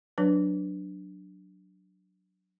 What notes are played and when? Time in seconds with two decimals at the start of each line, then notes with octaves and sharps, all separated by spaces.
0.18 F#3 D4 B4 C#5